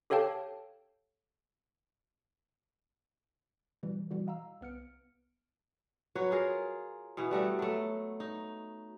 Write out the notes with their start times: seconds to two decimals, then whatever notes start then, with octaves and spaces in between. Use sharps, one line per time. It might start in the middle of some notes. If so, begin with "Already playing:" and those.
0.10 G4 A4 C#5 F5 G5 A5
3.83 B2 E3 G3
4.11 B2 E3 G3 F#4
4.27 D#5 F5 A#5 E6
4.61 C2 B3 F6 C#7 D7
6.15 F#3 F#4 B4 C#5
6.31 F4 G#4 A#4
7.17 B2 E3 B3
7.31 G3 A3 F#4
7.59 F#3 A3
8.20 D#4